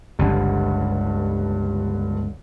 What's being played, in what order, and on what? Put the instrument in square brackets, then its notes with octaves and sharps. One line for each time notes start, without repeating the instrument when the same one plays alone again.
[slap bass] G1 C#2 [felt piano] G2 D3